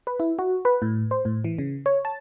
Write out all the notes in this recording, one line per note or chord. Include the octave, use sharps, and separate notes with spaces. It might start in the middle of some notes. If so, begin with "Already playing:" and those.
B4
E4
F#4
B4
A2
C5
A2
E3
C#3
C#5
A5